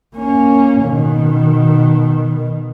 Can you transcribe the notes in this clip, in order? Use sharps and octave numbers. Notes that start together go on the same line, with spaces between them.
A#3 C#4
B2 D#3